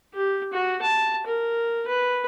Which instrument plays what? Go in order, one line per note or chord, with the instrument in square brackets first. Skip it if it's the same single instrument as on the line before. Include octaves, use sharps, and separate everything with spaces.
[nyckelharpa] G4
F#4
A5
A#4
B4